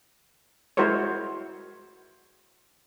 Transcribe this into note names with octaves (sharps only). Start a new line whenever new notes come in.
G#3 E4 F#4 A#4 C5 C#5